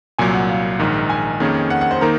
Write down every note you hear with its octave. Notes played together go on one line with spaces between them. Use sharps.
C2 A#2 F#3 G#5
F#5
F5
A#1 G#2 D#3
G#5
F2 D#3 A#3 C#4 G#4
F#5
F#5
C5
D#3 A#3 D#4 A#4